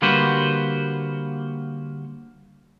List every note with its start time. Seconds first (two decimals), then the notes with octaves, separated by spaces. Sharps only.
0.02 D3 G3 A#3 F#4 B4 C5